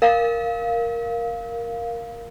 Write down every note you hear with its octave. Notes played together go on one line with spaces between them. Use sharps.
A#4 F5